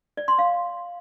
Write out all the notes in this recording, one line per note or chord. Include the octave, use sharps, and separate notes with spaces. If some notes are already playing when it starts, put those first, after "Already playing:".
D5
C6
F5